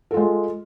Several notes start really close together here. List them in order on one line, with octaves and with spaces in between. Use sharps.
A4 F4 G#3